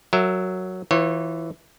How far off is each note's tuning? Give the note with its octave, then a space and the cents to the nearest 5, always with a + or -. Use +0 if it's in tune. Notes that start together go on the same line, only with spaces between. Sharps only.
F#3 +0 A#4 -20 E5 +0
E3 +0 F4 +15 C#5 -35